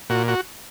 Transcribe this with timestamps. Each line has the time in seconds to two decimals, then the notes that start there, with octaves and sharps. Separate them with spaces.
0.10 A#2 F#4
0.28 F#4